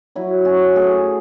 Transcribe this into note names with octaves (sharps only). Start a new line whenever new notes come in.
F#3 E4
C#4 F#4
A3 G#4